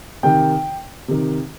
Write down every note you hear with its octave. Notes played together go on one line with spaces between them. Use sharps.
C3 D#3 G5
C3 D#3